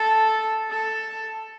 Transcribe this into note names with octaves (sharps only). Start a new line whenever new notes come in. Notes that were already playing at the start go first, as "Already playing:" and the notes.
Already playing: A4
A4